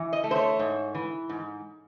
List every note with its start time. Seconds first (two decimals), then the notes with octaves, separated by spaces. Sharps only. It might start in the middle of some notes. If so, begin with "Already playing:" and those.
Already playing: E3
0.13 D#5
0.24 A3
0.31 C5
0.36 C#5
0.59 G#2
0.95 E3
1.29 G#2